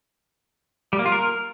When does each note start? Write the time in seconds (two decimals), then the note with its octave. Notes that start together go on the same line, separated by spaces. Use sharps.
0.93 G3
0.99 A#3
1.06 F4
1.12 A#4